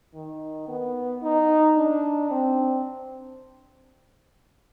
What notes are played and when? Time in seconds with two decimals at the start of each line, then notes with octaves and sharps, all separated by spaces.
0.15 D#3
0.68 B3
1.23 D#4
1.78 D4
2.31 C4